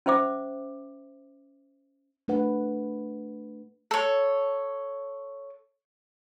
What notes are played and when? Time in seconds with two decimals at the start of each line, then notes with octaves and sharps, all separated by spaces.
0.06 C#4 C5 E5 D6
2.28 A3 D4 B4 F#5
3.91 A4 C#5